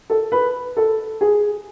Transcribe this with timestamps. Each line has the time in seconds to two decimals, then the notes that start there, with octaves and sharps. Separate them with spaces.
0.10 A4
0.32 B4
0.77 A4
1.21 G#4